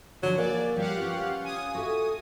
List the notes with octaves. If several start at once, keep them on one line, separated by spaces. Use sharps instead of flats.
D3 F3 F#3
A#3 G#4 D5
F3 G3 G4 F5 F#5
C#4 F4 B4
G#5 D#6
F#4 A4 E5